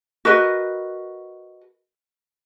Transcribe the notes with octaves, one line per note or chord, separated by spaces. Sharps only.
F#4 A#4 B4 D#5